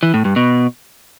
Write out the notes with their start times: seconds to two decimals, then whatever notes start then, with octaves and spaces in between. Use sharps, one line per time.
0.03 E3
0.14 A2
0.25 G2
0.36 B2